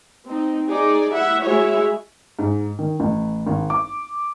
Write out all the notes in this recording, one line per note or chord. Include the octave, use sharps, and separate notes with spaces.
C4 D#4
D#4 G#4 D5
E4 E5 F#5
G#3 E4 F#4 G#4 C#5 E5
G#2
D#3
A1
G#1
D6